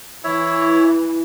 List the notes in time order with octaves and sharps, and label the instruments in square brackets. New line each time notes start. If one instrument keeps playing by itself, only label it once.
[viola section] E3 [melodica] E4 C#5 E5